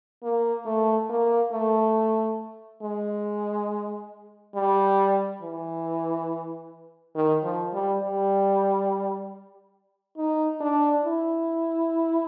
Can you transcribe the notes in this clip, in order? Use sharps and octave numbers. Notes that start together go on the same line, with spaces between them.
A#3
A3
A#3
A3
G#3
G3
E3
D#3
F3
G3
G3
D#4
D4
E4